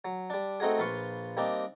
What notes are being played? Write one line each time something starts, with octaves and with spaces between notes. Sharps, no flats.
F#3
G3 D4
A3 C4 D#4 F#4 G#4
A#1 F4 B4 F5 C6 C#6
G3 A#3 C4 D4 D#4